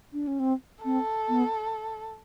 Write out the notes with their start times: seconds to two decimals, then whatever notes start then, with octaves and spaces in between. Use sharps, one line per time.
0.13 D4
0.27 C#4
0.40 C4
0.84 C4 A4
1.29 B3